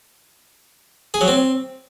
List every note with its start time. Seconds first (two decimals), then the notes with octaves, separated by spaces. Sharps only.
1.14 G#4
1.21 F#3
1.28 C4